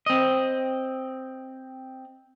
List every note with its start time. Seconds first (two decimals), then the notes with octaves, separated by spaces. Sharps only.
0.06 C4 D#5